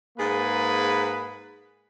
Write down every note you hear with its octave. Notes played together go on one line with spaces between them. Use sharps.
G#2 A#3 G#4 B4